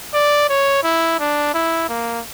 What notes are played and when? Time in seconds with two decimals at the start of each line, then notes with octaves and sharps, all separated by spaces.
0.14 D5
0.49 C#5
0.83 E4
1.19 D4
1.54 E4
1.89 A#3